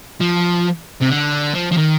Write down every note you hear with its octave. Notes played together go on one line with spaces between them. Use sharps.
F3
C3
D3
F3
F3
D#3